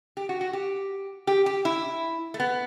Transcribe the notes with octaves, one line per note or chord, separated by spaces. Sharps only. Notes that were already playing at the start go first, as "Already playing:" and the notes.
G4
F#4
F#4
G4
G4
G4
E4
A3
B3